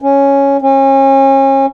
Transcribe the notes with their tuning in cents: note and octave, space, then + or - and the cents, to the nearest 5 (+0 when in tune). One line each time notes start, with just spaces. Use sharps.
C#4 +0
C#4 -35